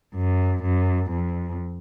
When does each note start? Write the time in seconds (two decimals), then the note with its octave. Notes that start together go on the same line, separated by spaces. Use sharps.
0.14 F#2
0.63 F#2
1.10 F2